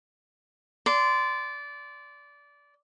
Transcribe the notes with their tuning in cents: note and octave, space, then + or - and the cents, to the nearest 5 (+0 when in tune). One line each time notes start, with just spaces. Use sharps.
D5 -20 C6 -20